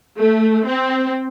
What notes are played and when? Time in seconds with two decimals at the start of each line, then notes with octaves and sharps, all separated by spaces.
0.18 A3
0.67 C4